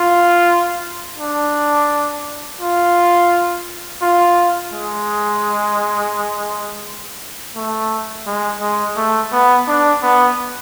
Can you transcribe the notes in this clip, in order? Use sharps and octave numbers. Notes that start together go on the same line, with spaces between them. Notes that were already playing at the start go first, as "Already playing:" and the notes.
Already playing: F4
D4
F4
F4
G#3
A3
G#3
G#3
A3
B3
D4
B3